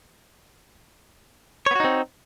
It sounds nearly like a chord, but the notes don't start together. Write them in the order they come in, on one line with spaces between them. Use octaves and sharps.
C#5 B3 F#4 D#4 C4